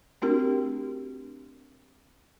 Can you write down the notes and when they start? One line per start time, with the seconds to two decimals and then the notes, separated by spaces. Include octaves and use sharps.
0.22 A3 C4 D4 F#4 G4 A#4